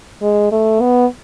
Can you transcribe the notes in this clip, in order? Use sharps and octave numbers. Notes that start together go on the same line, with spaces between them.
G#3
A3
B3